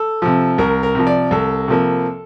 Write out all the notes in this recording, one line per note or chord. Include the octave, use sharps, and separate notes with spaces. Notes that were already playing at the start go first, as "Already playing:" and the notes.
Already playing: A4
C3 F3
C2 A#4
A#4
C3 F3
D5
C2 A4
C3 F3 A#3